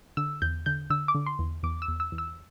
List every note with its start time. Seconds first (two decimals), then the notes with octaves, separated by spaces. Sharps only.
0.17 D3 E6
0.42 E2 G6
0.66 D3 G6
0.90 D3 E6
1.08 D6
1.15 D3
1.26 C6
1.39 E2
1.63 E2 D6
1.82 E6
1.88 E2
2.00 E6
2.12 E2
2.18 E6